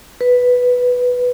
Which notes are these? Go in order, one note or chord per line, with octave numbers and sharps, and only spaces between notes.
B4